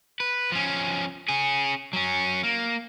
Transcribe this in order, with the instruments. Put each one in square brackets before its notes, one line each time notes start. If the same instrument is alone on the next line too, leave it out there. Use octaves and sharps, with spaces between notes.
[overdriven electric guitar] B4
F3 C#4
C#4 G#4
F#3 C#4
A#3